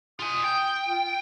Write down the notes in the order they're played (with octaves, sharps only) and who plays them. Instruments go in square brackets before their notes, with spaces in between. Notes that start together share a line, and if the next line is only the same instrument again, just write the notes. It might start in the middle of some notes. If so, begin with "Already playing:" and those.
[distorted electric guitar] F4 G#5 [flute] D#6
[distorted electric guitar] G5
[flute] F4